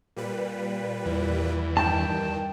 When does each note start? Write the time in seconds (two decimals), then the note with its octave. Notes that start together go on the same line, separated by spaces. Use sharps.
0.16 A#2 G3 B4
1.06 E2
1.77 G2 D#3 G5 A5